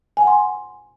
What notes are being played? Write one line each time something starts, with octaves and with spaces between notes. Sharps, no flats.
G#5
F#5
C6